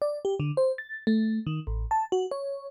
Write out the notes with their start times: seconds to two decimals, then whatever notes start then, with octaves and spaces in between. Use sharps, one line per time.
0.02 D5
0.25 G4
0.40 D3
0.57 C5
0.78 A6
1.07 A3
1.47 D#3
1.67 A1
1.91 A5
2.12 F#4
2.31 C#5